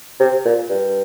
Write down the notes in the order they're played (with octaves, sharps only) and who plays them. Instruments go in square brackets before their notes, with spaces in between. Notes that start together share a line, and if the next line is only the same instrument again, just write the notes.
[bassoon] C3
A#2
G2